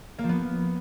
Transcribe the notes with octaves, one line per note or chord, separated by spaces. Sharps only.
A#3
F3
B3